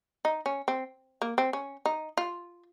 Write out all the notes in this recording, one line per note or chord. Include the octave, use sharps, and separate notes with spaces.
D#4
C#4
C4
A#3
C4
C#4
D#4
F4